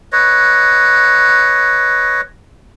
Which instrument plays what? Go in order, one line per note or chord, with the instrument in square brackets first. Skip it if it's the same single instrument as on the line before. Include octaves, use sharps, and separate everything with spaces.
[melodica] B4 C#5 D#5